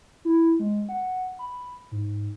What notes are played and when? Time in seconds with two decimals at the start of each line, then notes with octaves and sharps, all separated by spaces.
0.25 E4
0.59 G#3
0.89 F#5
1.39 B5
1.91 G#2